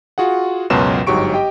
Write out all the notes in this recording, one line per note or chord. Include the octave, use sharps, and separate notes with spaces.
F4 F#4 G#4 F#5
C#2 F#2 B2 F#3 C6 E7
G1 G#2 F#3 G4 C#6 D7
G4 D#5 G5